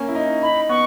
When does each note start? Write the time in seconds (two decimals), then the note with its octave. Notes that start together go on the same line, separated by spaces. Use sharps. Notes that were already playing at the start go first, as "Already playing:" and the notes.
Already playing: A#3 C#4
0.08 E4
0.15 D#4
0.42 D#4 B5
0.69 B3 C#6